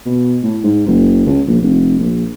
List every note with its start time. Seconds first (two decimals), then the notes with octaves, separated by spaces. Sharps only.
0.06 B2
0.43 A2
0.63 G#2
0.87 F#1
1.26 C#2
1.48 A#1
1.62 F1
1.99 A#1